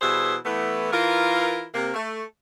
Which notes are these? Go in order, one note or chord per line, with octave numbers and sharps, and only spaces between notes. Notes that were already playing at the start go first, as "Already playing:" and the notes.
B2 E3 G3 G#4 C5 E5
E3 A3 B3
E3 F4 A#4
C3 A#3
A3